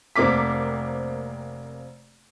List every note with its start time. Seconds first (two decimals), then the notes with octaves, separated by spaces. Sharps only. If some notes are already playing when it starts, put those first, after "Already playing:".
0.16 F1 A#3 C4 D6 B6